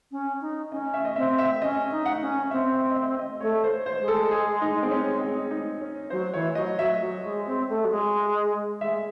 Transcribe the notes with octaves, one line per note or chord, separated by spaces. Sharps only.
C#4
D#4
C#4 D#5
E5
D#5
C4 E5
E5
C#4 D#5
D#4
F#5
C#4
C4 E5
E5
D#5
E5
D#5
A3 C#5
C5
C5
G#3
A4
G#4
D#4
C4
C#4
C4
D#4
C#4
F#3 C5
E3 C#5
F#3 D#5
F#3 E5
F#3
G#3
C4
A3
F#3
G#3
G#3 E5